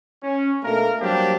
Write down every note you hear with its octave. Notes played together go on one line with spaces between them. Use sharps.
C#4
B2 A3 A#3 D4 A#4
F#3 G3 A#3 C4 D4 G4